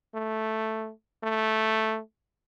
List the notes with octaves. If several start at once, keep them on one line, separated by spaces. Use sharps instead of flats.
A3
A3